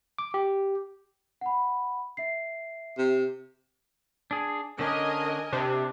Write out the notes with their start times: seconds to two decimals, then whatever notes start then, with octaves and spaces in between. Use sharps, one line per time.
0.18 D6
0.34 G4
1.41 F#5 B5
2.17 E5 C7
2.98 C3
4.31 D4 G#4
4.79 D3 C#4 D4 A#4 D#5 G#5
5.53 C3 D4